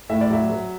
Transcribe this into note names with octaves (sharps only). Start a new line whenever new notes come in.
A2 E5
D5
F#3 E5
F#3